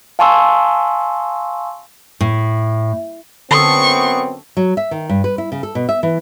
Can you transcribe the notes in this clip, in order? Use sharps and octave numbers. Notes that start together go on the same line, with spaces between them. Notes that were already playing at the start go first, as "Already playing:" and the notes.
F5 G#5 A5 C6 C#6 E6
A2
F#2 D3 B3 C4 A4 C#6 D#6 C7
F#3
E5
D#3
G2
B4
E4
C#3
A4
B2
E5
E3